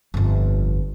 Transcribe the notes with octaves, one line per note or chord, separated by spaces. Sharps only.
G1 F2